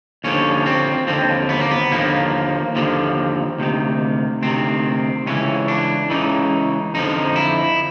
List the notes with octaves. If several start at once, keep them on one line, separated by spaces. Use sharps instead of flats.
D#2 D3 F3 C#4
C4
D#2 D3 F3 C4
B3
A#3
B3
D#2 D3 F3 A#3
D#2 D3 F3
D2 C3 D#3
D2 C3 D#3 C4
C#2 C#3 E3 C#4
D4
C#2 C#3 E3 D#4
F2 D3 F3 D#4
E4